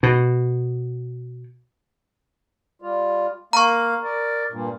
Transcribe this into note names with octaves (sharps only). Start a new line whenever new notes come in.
B2
G3 F4
A#3 F5 A#5 C#6
A#4 D5
G2 A#2